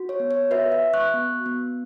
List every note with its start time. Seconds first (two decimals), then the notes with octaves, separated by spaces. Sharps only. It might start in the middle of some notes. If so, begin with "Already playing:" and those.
Already playing: F#4
0.09 C#5
0.20 B3
0.31 C#5
0.51 F#4 B4 E5
0.72 B4 E5
0.83 F#4
0.94 C#6 F#6
1.14 B3
1.46 B3